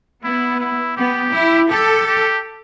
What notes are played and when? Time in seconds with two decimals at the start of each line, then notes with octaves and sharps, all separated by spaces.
0.24 B3 E4
0.60 E4
0.97 B3 G4
1.33 E4
1.70 G4 A4
2.07 G4